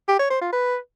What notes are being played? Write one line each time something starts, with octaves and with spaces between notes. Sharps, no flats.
G4
C#5
C5
F4
B4